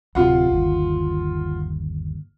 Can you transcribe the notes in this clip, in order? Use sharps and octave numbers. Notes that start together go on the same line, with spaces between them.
D1 C3 F4 F#5
G1 D#2